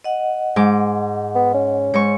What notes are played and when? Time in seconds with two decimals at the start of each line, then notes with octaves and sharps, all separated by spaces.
0.04 D#5 F#5
0.56 G#2 D6
1.35 B3
1.54 C#4
1.94 G#2 C#5 C#6